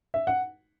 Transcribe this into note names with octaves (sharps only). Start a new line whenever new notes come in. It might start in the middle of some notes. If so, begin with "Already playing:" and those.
E5
F#5